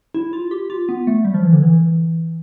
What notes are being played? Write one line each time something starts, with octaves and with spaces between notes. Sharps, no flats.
E4
F4
G4
F4
B3
A3
G3
F3
E3
D3
E3